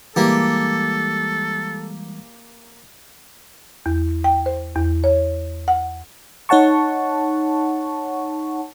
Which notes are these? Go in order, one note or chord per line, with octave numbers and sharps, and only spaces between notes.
E3 G3 G#3 A#3 G4 A4
E2
G5
C5
E2
C#5
F#5
D#4 C#5 F#5 A5 C#6